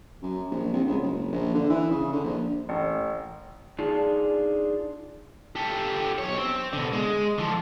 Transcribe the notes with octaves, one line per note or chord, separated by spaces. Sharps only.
F#2
A#1
C2
C#2
F#1
A#1
D3
E3
C#3
D3
A#1
A1
D4 D#4 F4 G#4
G4 A4
B1 C#5
C4
B2 D3
G#3
D3 F3